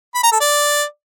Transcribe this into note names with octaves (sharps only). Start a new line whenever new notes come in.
B5
A#5
A4
D5